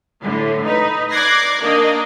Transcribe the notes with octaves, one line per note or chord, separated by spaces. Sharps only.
A2 D3
D#4 B4
D5 D6 F#6 G#6 A#6 C7
D#3 A#3 D4 D#5